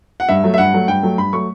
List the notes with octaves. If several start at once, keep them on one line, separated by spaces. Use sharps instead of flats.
F#5
G2 E5
F#3 A3
E5
G2 F#5
F#3 A3
G2 G5
F#3 A3
G2 B5
F#3 A3 C#6